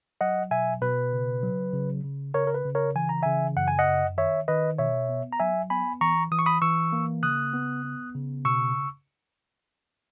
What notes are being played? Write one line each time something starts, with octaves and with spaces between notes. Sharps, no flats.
F#3 D#5 F#5
B2 E5 G#5
B2 B4
C#3
F#3
C#3
C#3
C#3 A#4 C#5
A#4
B4
C#3
A#4 C#5
E3 G#5
A#5
C#3 E5 G#5
F#2 F#5
G#5
D#5 F#5
F#2
D#3 C#5 E5
D#3 B4 D#5
B2 C#5 E5
B3
A#5
F#3 E5 G#5
B3 G#5 B5
E3 A#5 C#6
E3 D#6
C#6
B5 D#6
E3 C#6 E6
A#3
C#3 D#6 F#6
B3
B3
C#3
B2 C#6 E6